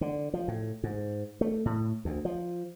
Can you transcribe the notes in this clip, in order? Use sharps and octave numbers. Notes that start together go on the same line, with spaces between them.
D3
F3
A2
G#2
A3
A2
D2
F3